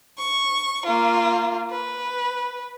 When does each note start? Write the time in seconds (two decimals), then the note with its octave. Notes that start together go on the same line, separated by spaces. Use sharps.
0.18 C#6
0.86 A#3 F4
1.71 B4